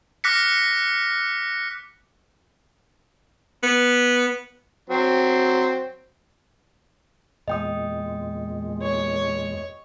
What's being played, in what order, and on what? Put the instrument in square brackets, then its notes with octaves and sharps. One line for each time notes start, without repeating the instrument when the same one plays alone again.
[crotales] D6 F6 F#6 A#6 B6 C#7
[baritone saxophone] B3
[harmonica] F#3 C4
[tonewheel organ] E2 A#2 G#3 [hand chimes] D#5 G5 D#6
[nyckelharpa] C#5